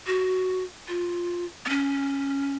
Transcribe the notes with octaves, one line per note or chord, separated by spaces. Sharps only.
F#4
F4
B3
C#4